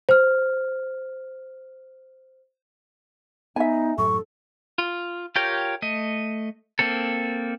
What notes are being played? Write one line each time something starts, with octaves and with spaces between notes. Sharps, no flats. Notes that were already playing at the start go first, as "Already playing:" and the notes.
C5 F6
B3 D#4 E5 G#5
F#2 A2 F#3 A4 C#6
F4
F4 G4 A#4 C#5 G5
A3 D#5
A#3 C4 A4